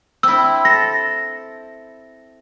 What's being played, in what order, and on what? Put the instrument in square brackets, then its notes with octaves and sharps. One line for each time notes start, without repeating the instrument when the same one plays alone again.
[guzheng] C4 E4 [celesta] E6
[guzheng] A4 [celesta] A#6